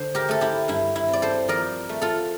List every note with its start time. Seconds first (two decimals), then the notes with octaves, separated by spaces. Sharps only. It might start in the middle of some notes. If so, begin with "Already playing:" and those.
Already playing: D3 C5
0.15 G4 A#4
0.29 A3 A4
0.41 E4 G4
0.68 G2 E4
0.96 E4
1.08 C4
1.13 D5
1.22 A4 C5
1.48 F3 A#4 D5
1.89 A3
2.02 F4 A4